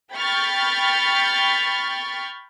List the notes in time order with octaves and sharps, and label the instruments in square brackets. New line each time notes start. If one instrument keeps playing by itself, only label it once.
[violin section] G5 B5 C#6 F6 G6 A6